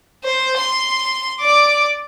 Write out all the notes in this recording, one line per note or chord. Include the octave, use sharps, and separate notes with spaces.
C5
C6
D5 D6